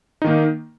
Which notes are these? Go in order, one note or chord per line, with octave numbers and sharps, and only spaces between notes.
D#3 A#3 D#4